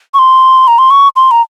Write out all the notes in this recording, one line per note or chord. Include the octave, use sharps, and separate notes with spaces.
C#6
C6
A#5
C6
C#6
C6
A#5